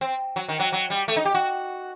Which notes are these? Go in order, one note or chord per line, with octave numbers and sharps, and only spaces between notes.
C4
F#3
D#3
F#3
F#3
G3
A3
D#4
G4
F#4